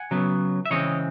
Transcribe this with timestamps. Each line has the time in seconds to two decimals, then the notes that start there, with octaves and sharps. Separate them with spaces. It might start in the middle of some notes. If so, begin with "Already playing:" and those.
Already playing: F#5 G#5
0.11 C#3 F#3 B3
0.66 E5
0.70 C#3 E3 G#3 C4 C#5 D#5